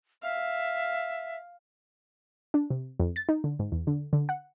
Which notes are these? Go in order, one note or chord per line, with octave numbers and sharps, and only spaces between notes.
E5 F5
D4
C3
F2
A6
D#4
D3
G#2
E2
D3
D3
F#5